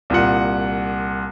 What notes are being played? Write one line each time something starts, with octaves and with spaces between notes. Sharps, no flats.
C2 A#2 F#5